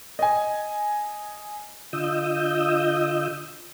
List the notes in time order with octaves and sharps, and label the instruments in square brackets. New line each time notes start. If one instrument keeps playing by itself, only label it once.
[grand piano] D#5 G#5
[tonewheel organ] D3 F4 D#5 D#6 E6 G6